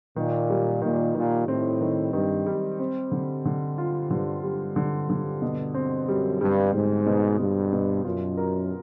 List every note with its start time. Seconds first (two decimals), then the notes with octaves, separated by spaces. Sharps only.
0.16 A#2 D#3
0.50 G3
0.82 A#2 D#3
1.15 A#2 D#3
1.47 A2 C4
1.81 D#3
2.13 G2 D#3
2.46 G3
2.80 C4
3.12 D3
3.45 D3
3.78 F4
4.11 G2 D3
4.43 G2 G3
4.76 D3
5.10 D3
5.42 B2
5.74 C4
6.08 F#2 G3
6.41 G2 G3
6.73 G#2 G3
7.06 B2
7.39 G2 B2
7.73 B2
8.05 F#2 F4
8.37 A#4